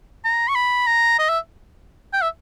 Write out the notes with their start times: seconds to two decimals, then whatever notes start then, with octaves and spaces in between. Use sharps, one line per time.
0.24 A#5
0.48 C#6
0.55 B5
0.87 A#5
1.19 D#5
1.29 E5
2.13 G5
2.22 E5